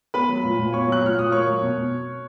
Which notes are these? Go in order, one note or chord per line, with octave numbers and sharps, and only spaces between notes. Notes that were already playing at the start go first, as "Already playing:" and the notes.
B3 B4 B5
F#3
A#2
A#2
B3 C#5 C#6
F#3 F#6
A#2 F6
A#2 D#6
A#3 C#5 C#6
F#3
B2
B2